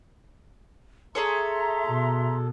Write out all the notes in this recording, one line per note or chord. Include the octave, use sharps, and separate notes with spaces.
G#4 A4 C#5 E5 A#5 C6
B2